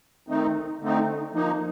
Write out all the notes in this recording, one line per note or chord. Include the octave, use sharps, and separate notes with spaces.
D#3 A3 C4 D#4
D3 A3 C4 D#4
F3 A#3 D#4